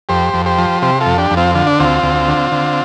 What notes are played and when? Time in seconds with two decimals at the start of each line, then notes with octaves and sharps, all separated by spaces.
0.09 F2 G4 C5
0.34 F2
0.46 G4 C5
0.58 F3
0.82 C3 G4 C5
1.00 F4 A4
1.06 F2
1.18 D4 G4
1.31 F2
1.37 C4 F4
1.54 D3 F4
1.67 D4
1.80 D2 C4 F4
2.03 D2
2.28 D3
2.52 D3